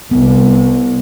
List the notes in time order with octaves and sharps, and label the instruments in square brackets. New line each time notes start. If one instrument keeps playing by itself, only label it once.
[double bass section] C2 [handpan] B3